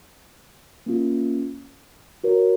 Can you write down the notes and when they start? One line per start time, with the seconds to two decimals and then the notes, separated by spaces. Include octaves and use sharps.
0.86 A#3 C#4 F4
2.24 F#4 A#4 C#5